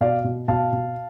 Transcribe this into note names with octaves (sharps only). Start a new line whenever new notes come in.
B2 D5 F5
B2
B2 F5 A5
B2